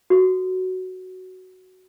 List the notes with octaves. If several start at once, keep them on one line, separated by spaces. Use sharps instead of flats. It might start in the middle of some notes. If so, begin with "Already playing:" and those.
F#4 A4